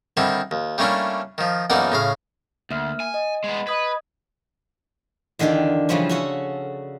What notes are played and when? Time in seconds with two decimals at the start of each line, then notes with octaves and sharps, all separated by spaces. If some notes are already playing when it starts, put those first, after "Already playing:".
0.17 D3 D#3 G3 C4 E4
0.51 D#2
0.78 G3 A3 A#3 C#4 D4 E4
1.38 D#3 F3
1.70 B1 F#2 E3 A#3 D#4 D5
1.92 A2 C#3 F5
2.70 D2 A#3 E5 F6
3.00 G#5
3.14 D#5
3.44 G#3 B3
3.67 B4 D#5 D#6 G#6
5.39 E2 D3 D#3 D4 G4 F5
5.89 C#3 E3 F3 G3 C4 C#4
6.09 C#4 F#4 A4